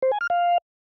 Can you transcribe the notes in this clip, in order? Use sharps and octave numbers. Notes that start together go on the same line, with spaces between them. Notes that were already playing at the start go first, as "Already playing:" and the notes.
C5
G#5
F6
F5